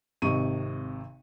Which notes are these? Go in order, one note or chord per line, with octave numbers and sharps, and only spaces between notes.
G#1 C3 D#5 C#6 D#7